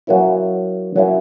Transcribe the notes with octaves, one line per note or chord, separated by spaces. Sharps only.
F#3 A#3 C#4 E4
F#3 A#3 C#4 E4